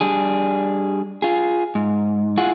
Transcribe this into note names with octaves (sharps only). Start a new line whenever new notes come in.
G3 D4 G#4
F4 G#4
G#2
E4 F4 G#4 F#5